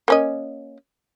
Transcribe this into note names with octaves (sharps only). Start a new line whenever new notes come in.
A#3 C#4 D#5